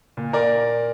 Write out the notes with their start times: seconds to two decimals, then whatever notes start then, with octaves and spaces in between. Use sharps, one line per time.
0.17 A#2
0.33 A#4 D5
0.40 A#3